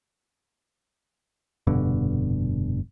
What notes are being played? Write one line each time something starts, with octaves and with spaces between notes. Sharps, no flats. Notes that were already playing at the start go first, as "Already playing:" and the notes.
F1 G2 B2 D3